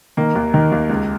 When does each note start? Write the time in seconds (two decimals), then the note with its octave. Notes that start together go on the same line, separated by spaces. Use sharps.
0.17 D#3 A#3
0.35 D#2
0.54 D#3
0.72 D#2
0.89 C#2